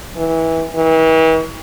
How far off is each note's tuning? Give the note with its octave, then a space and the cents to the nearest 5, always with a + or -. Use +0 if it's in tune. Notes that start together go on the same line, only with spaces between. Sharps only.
E3 -20
E3 -40